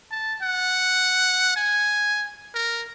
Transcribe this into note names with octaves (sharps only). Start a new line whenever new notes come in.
A5
F#5
G#5
A#4